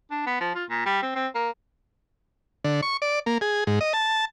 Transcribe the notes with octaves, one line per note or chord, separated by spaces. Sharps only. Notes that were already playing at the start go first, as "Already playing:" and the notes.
D4
B3
F3
F4
A#2
G3
C4
C4
A#3
D3
C#6
D5
A#3
G#4
G#2
D#5
A5